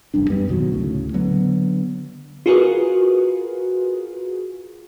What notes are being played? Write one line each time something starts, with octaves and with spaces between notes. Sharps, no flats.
F1 A#1 G2 D4
F#2 G3 B3
G#1 B2 D#3 F#3
D2 A2 C#3
D3 F#3 B3
F4 F#4 G#4 A#4 B4